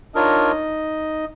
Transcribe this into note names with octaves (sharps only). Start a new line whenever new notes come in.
D4 D#4 F4 A#4 C#5 D#5